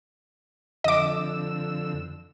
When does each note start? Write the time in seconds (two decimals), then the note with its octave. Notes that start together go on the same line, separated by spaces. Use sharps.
0.84 F2 D3 D#5 D6 E6